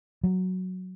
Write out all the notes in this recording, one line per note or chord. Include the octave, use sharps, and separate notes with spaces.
F#3